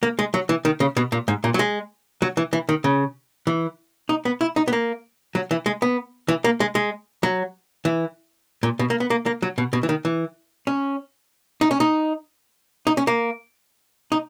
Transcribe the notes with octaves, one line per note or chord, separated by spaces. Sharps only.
A#3
G#3
F#3
E3
D#3
C#3
B2
A#2
G#2
A#2
F#3
G#3
F#3
E3
E3
D#3
C#3
E3
D#4
B3
E4
D#4
B3
A#3
F#3
E3
G#3
B3
E3
A#3
G#3
G#3
F#3
E3
A#2
B2
A#3
B3
A#3
A#3
F#3
B2
B2
E3
D#3
E3
C#4
D#4
C#4
D#4
D#4
C#4
A#3
D#4